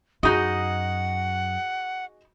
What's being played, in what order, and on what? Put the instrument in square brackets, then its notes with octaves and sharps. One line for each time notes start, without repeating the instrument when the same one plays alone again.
[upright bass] F#2 [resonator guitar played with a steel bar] D#4 D#5 [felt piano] F#4 G#4 [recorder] F#5